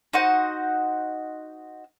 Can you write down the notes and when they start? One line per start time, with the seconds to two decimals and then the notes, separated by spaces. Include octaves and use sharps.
0.13 D#4 F#4 C5 F#5